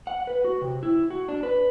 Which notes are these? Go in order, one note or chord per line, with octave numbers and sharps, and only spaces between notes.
F#5
B4
F#4
C3
E4
F#4
D4
B4